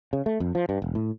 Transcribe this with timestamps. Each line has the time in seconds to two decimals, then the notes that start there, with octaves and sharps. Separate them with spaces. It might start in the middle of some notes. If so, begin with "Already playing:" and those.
0.13 C#3
0.26 A3
0.40 F2
0.55 F3
0.69 G2
0.82 E1
0.95 A2